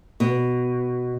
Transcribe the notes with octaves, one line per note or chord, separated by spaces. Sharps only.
B2